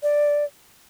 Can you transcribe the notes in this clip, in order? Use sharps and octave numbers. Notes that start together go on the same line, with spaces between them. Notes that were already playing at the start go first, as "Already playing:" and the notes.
D5